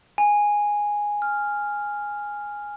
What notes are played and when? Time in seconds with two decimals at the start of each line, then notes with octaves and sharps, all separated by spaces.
0.18 G#5
1.22 F6